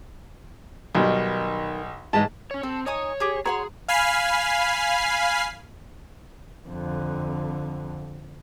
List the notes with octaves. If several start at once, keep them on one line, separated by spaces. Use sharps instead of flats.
B1 B2 D#3 G3
G#2 E3 G#3 A5
C#4 C#5
C4 A4
D#4 C#5 G#5 D#6
G4 G#4
F#4 G#4 C#5 F#5 A#5 C6
F5 G#5 B5 F6 C7
F2 D3